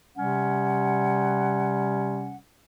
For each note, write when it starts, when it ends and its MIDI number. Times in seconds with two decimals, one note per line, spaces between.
0.17 2.37 48
0.17 2.37 55
0.17 2.37 61
0.17 2.37 78